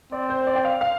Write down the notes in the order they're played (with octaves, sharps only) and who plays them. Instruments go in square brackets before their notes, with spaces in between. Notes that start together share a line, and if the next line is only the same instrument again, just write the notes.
[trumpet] C4 [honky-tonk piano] D5
[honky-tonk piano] C5
D5
G5
F5
F5